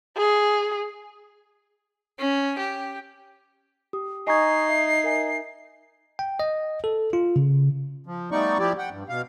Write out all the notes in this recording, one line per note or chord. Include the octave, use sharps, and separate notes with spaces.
G#4
C#4
G4
G4 D#6
D#4 D#5 G#5 A#5 C#6 D#6 G#6 C7
E5
A#4 E5 G#5
G5
D#5
A4
F4
C#3
F3
G3 A3 B3 D#4 D5 C#6
F3 E4 G4 D5
F#5 G5
G2
B2 F5